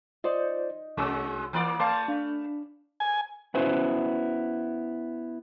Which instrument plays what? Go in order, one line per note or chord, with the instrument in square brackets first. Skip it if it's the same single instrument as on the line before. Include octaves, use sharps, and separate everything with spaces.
[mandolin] D#4 [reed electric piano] F4 C5 D5
[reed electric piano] C2 E6 [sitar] G#3 C#4 F#4
[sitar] E3 A#3 D5
[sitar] A3 [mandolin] F4 A5 [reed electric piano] C6
[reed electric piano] D4 [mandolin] F5 B5
[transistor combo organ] G#5
[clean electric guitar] B3 C#4 E4 F#4 B4 C5